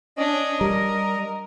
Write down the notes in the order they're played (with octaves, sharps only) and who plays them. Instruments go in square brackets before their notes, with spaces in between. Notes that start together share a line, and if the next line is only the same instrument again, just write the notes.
[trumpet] C#4 [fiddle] D4 C#5 [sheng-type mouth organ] D#5
[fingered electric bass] G3 [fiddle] A#4 [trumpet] A#5